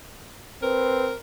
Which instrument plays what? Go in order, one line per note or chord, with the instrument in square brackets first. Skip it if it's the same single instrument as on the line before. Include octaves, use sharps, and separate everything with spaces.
[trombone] C4 [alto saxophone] A#4 [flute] B4